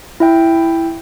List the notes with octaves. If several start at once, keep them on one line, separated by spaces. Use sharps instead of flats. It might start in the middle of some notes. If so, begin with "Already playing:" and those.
E4 E5 G5